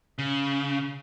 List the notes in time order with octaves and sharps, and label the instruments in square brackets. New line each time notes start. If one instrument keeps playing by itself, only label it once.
[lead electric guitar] C#3